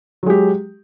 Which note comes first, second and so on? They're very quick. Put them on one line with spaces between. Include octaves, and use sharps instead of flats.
F#3 G#3 G4